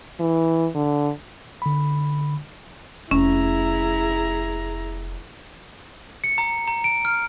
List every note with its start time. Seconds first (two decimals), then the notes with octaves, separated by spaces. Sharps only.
0.19 E3
0.75 D3
1.62 D3 B5
3.11 F1 C#4 E4 G#4 A#5
6.24 C#7
6.38 A#5
6.68 A#5
6.84 D7
7.05 F6